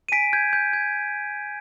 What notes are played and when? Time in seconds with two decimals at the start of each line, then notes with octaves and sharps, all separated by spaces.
0.09 D#7
0.12 G#5 B6 D7
0.33 G6 G#6
0.53 G6
0.73 G6 G#6